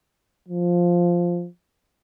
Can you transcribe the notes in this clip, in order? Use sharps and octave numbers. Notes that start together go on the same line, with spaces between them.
F3